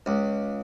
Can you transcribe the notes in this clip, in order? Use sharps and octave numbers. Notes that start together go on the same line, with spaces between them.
C#2